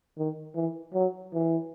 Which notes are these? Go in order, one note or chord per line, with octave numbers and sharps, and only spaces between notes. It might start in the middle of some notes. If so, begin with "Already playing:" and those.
D#3
E3
F#3
E3